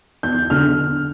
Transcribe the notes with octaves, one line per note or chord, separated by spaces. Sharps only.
E2 G6
D3 F6